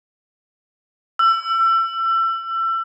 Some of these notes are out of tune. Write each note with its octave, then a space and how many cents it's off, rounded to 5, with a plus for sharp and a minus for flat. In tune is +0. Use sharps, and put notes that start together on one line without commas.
E6 +30